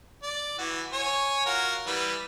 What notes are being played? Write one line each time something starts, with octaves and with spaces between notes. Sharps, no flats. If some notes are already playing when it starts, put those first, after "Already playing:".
D5
E3 F#4
C#5 G#5
F4 F#4 A#4
E3 G3 B4